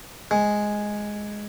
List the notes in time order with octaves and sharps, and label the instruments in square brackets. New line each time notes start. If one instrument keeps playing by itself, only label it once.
[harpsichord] G#3